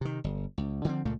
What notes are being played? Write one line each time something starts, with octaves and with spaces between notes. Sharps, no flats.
C3 D#3
G1
C#2
D3 F3 C4
C#2 A#2 A3 A#3